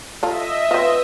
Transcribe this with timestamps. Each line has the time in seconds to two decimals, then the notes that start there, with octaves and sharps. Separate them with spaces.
0.23 F4 A4 D#5 E5
0.71 C4 F4 B4